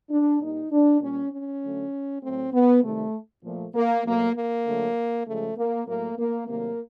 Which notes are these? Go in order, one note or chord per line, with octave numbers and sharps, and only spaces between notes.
D4
A#2 G3 D#4
D4
A#2 G3 C#4
C#4
D3 F#3 A3
A2 F#3 A3 C4
B3
C3 D#3 G3 A3
A#2 F3 A3
A#3
B2 F#3 A3 A#3
A#3
D3 F#3 A3
C#3 F3 G#3 A3
A#3
A2 F#3 A3 A#3
A#3
C3 D#3 F#3 A3 A#3